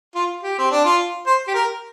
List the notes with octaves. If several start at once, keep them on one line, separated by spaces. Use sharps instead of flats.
F4
G4
C4
D4
F4
C5
G4
A#4